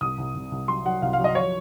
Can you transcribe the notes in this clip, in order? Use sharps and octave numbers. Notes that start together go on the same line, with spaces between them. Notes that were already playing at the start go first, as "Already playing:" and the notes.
C2 D#6
C2
C2
C2
F#3 C6
F#3 F#5
C2 F5
F5
F#3
D#5
F3 C#5